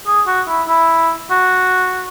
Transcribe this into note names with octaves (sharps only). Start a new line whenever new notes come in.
G#4
F#4
E4
E4
F#4